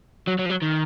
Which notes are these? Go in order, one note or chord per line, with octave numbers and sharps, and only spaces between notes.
F#3
F#3
F3
F#3
D#3